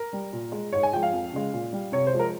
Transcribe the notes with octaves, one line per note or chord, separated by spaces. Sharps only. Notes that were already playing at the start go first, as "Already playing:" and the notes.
Already playing: A#4
G3
A#2
G#3
G#2 C#5
G#5
F3 G#3 G5
F5
F2
C#3 G#3
A#2
G3
C3 C#5
C5
F3 G#3
A#4